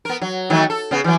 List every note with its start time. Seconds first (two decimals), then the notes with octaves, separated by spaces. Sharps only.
0.05 B3 A#4
0.21 F#3
0.50 D#3 F#3 A3
0.70 A4
0.91 C#3 B3
1.04 E3 F#3